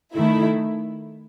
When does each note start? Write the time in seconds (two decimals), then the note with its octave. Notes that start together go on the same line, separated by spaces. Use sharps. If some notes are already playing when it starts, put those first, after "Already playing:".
0.15 D#3 A3 E4